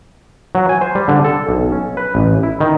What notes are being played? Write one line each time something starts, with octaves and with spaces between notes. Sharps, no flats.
F#3
G#5
C5
G3
D3
A4
B1
C#4
B4
A1
E4
D#3